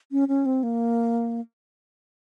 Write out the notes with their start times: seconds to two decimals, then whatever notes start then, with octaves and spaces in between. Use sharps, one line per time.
0.12 C#4
0.28 C#4
0.46 C4
0.63 A#3